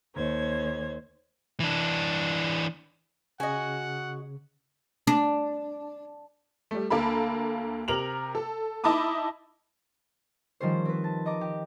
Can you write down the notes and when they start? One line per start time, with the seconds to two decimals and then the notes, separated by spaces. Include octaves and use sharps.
0.16 D#2 C5 C#5 G#6
1.60 E3 D4
3.40 C#3 F#4 D#5 F#5 G#5
5.07 D4
6.71 G3 A3
6.90 D2 A#3 A4 B5
7.88 C3 A#4 F7 F#7
8.35 A4
8.84 D#4 E4 A5 B5 D6 D#6
10.60 D#3 F3 G3 C#4 C5
10.85 C4 B4
11.04 A5
11.26 D#5 A#5 D6 A#6
11.41 G4